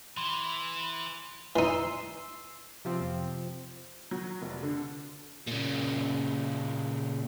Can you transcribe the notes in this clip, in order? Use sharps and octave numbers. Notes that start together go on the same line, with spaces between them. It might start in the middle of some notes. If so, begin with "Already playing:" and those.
E3 B5 C6
E3 D#4 C6 E6
C3 F3 C4
F#3
F1
D3
A#2 C#3